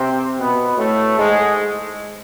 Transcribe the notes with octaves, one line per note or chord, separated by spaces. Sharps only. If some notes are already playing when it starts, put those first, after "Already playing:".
Already playing: C3 C4
B2 B3
A2 A3
G#2 G#3